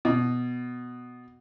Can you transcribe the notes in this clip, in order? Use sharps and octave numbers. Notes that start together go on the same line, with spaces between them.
B2